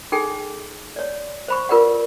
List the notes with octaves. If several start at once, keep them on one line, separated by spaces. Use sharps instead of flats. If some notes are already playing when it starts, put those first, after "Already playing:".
D#4 G#4 A4 G5
C#5 D5
C5 B5 C#6
F4 A#4 B4 D5 F#5